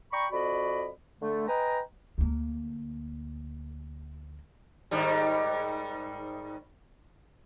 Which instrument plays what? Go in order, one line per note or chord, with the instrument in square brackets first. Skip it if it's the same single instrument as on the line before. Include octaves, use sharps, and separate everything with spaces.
[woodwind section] D5 G5 A#5 B5 C#6
F2 F#4 D5 D#5 B5
D3 A3
B4 D#5 G5 G#5 A#5
[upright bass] D2 A#3
[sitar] G#2 D#3 G3